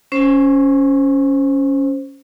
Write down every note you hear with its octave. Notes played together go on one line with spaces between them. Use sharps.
C#4 C5